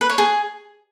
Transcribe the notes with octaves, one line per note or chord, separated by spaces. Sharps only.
B4
C#5
G#4